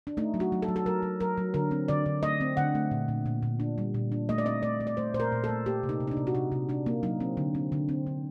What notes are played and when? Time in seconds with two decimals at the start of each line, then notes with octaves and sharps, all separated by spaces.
0.07 D4
0.17 A3 D#4
0.34 F#3
0.40 F#4
0.52 F#3
0.62 A4
0.68 F#3
0.76 A4
0.86 F#3 A#4
1.03 F#3
1.20 F#3 A#4
1.38 F#3
1.54 D3 A#4
1.71 C4
1.88 D3 D5
2.06 D3
2.22 A3 D#5
2.41 C4
2.57 D3 F#5
2.75 A3
2.91 A#2
3.08 A#2
3.26 A#2
3.43 A#2
3.60 D4
3.78 G3
3.94 A#2
4.12 D4
4.29 A3 D#5
4.38 D5
4.45 C4 D#5
4.63 A3 D5
4.80 A3
4.87 D5
4.97 A3 C5
5.14 A#2 C5
5.20 A#4
5.32 A#2
5.44 A4
5.49 A3
5.66 A#3 G4
5.83 C3
5.89 D#4
6.00 C3
6.07 D#4
6.11 D4
6.17 C3
6.27 F#4
6.35 C3 D#4
6.52 C3
6.69 C3 D4
6.86 A#3
7.03 F#3 D#4
7.20 C4
7.37 D3
7.55 C4
7.72 D3
7.89 C4
8.07 D3